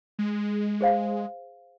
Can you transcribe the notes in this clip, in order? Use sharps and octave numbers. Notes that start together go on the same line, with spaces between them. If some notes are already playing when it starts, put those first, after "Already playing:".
G#3
G#4 C5 F5